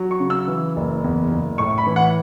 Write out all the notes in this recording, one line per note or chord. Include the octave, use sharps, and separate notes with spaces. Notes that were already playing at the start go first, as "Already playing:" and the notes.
Already playing: F#3
C#6
C#3
E6
E3
F#1
E2
F#1
A2 C#6
B5
E3
F#5